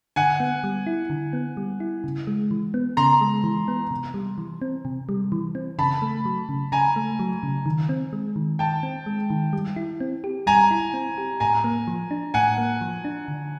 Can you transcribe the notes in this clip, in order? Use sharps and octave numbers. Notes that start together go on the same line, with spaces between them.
D3 F#5 G#5
B3
G3
E4
D3
B3
G3
E4
C#3
G#3
E3
B3
C#3 A#5 C6
G#3
E3
B3
C3
G3
E3
C4
C3
G3
E3
C4
C#3 A5 B5
A3
F#3
C#3
C#3 G#5 A#5
A3
F#3
C#3
D#3
C4
G#3
D#3
D#3 G5 A5
C4
G#3
D#3
G3
E4
C4
G4
G3 G#5 A#5
E4
C4
G4
A2 G#5 A#5
A#3
F3
D4
A2 F#5 G#5
A#3
F3
D4
D3